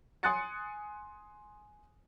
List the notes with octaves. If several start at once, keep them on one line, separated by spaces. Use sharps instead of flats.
G#5 C6 D#6 F#6 A6 C#7